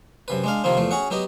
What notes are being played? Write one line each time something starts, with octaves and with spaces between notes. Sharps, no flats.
F#2 C3 B4
G#3 D4 F5
C3 D#3 F3 A#3 C4
E2 F3 A3
C#4 F#4 G#4 F#5
F#3 B3 G4 D#5